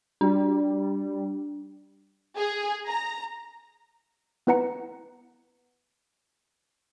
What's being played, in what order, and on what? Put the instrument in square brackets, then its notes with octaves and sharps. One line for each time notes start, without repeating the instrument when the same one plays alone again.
[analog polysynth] G3 [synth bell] D4
[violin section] G#4
A#5
[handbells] B3 E4 B4 F#5 A#5 C#7